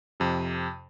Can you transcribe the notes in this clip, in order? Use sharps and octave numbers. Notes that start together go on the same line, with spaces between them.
F2 C3